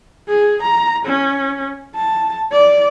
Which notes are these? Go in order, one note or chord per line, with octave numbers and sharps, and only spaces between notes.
G#4
A#5
C#4
A5
D5